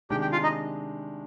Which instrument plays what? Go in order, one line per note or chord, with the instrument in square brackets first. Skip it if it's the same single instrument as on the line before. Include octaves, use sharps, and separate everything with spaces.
[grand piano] C3 D#3 G#3 D4 [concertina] G4 G5
[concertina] G4 G5
F4 F5
D#4 D#5